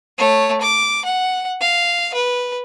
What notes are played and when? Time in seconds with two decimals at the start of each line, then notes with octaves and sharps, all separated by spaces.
0.18 A3 C#5
0.61 D6
1.05 F#5
1.61 F5
2.14 B4